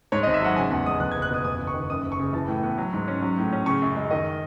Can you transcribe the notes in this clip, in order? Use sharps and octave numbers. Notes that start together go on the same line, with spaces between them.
G#2 C#5
D#5
G#1
E5
F#3 F#5
C#3 G#5
E2 F#5
G#3 D#6
E2 F#6
G#6
F#1
F#6
B2 D#6
E2 D#6
F#1
C#6
D#3
F#2 D#6
F#1
C#6
C#3
E3 A5
A2
B3
F#3
G#2
C#4
F#3
A2
C#4
C#3 C#6
F#2
G#3
D#3 D#5